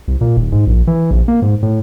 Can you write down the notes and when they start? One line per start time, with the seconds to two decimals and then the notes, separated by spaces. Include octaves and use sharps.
0.08 C2
0.21 A#2
0.37 D#1
0.52 G#2
0.67 A#1
0.87 E3
1.11 A#1
1.28 A#3
1.42 G#2
1.63 A2